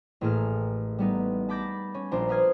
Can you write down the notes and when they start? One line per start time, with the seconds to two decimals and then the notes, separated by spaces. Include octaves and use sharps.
0.21 A1 A2 A#3 G#4 A4 F6
0.99 G3 B3 D#4
1.49 A5 B5 D6 G6 A6 A#6
1.94 C#4
2.11 A#1 D4 C5 A#5
2.29 B4 C5 F5 D#6 F6 G#6